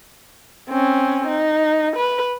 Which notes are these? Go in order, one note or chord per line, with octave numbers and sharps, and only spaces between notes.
C4 C#4
D#4
B4